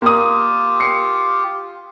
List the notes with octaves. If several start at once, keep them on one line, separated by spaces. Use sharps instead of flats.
A#3 F4 G4 D#6
C7 C#7